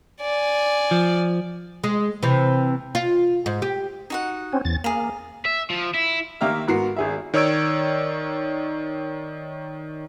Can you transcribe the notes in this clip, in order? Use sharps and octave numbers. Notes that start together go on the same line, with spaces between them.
D5 G#5
F3
G#3
C3 E3
F4
G#2
G4
D#4 F#4 F#5
C4 C#4
E2 A6
A#3 G#4 A#5
E5
F3
E4
D#3 A#3 G4 E5 A#5 F6
G#2 B3 F#4 A#4 C7
G#1 G#4 E5
D#3 C#5 D5 E6 G#6 D7